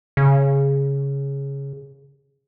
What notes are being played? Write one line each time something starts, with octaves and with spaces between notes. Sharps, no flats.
C#3